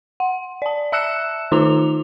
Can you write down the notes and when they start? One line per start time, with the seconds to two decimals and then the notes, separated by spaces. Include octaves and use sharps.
0.20 F#5
0.62 D5 A5
0.92 E5 A5 E6 F#6 C#7 E7
1.52 D#3 D#4 F4 A#5 D6 F7